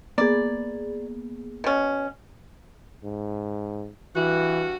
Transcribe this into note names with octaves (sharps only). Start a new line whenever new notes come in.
A#3 B3 G#4 D5
B2 C#4
G#2
G2 E3 F#4